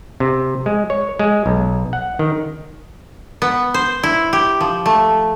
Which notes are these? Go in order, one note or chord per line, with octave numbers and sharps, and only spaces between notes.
C3
G#3
C#5
G#3
B1
F#5
D#3
B3
C5
E4
G4
F3
A3